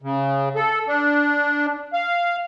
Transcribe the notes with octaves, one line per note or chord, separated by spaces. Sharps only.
C#3
A4
D4
F5